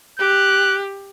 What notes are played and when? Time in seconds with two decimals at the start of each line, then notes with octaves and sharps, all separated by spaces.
0.19 G4 F#6